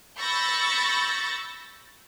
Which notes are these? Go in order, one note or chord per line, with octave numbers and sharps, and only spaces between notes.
B5 C#6 E6 G6 A6 A#6